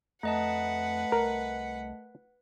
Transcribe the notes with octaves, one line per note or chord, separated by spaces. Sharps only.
F2 A3 B4 D#5 F#5 A5
C2 A#4